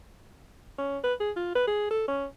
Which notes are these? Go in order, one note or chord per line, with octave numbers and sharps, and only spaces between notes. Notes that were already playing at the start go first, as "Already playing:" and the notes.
C#4
B4
G#4
F4
B4
G#4
A4
C#4